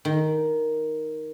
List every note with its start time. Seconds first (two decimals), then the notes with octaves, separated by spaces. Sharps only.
0.05 D#3